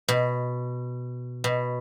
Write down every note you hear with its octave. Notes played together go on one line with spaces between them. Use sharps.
B2
B2